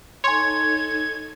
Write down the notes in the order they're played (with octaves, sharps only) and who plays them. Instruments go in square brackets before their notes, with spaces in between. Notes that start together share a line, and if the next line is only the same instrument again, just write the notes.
[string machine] D#4 A4 [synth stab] C#5 [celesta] G#5 C6 [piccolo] G#6